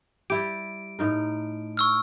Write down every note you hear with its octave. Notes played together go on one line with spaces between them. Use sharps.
G3 E4 G4 D7
A2 D#4 A#4
C#6 E6 F6